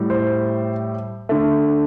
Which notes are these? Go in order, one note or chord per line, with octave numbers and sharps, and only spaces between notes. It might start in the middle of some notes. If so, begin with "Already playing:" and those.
Already playing: A2 G3
C5
D3 A3